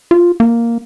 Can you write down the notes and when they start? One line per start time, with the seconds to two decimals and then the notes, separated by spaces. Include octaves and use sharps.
0.11 F4
0.40 A#3